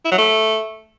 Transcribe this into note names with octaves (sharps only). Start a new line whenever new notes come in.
E4
F#3
A3